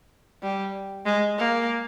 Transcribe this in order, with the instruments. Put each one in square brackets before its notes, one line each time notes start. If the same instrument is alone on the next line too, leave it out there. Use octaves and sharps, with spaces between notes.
[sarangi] G3
G#3
A#3